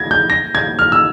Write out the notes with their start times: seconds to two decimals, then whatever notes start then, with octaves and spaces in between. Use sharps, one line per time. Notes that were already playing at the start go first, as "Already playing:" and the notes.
Already playing: G#6 A#6
0.11 G6
0.30 A#6
0.55 G#6
0.79 F6
0.92 E6